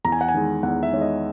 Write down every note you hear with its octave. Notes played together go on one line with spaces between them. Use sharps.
E2 A#5
G#5
F#5
G#5
D#3 G#3
E2 F#5
E5
D#3 G#3 C#5
D#5